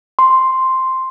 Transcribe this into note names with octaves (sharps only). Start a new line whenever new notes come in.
C6